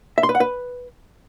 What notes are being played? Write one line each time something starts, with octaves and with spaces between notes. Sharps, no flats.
E5
C6
B4
F#5
B4